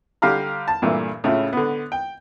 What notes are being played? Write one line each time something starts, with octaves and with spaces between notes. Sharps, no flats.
D3 G3 G4 F5 A#5 F6
A5
G2 A#2 E3 A3
A2 C#3 E4 F4
D3 B3
G5